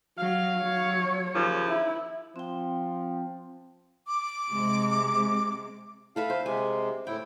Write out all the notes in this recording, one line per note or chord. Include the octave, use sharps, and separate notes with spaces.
F#3 F5
F#3 C#5
D#2 C#3 F3
E4
F3 C4 G5
D6
C3 G#3
A4 B4 E5 F5
C5
C3 G#3 G#5
A2 E4 G5